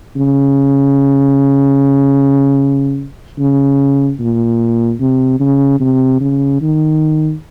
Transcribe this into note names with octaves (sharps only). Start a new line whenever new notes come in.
C#3
C#3
A#2
C3
C#3
C3
C#3
D#3